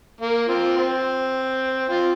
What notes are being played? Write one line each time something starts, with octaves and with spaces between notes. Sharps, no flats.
A#3
C4 F4
C4
C4 F4